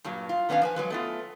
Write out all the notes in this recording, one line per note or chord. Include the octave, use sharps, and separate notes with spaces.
G2 A#2 F#3
F4
D#3 B3 C#4 D4 F5
F3 B4 G#5
F#3 G#3 B4
A3 B3 F4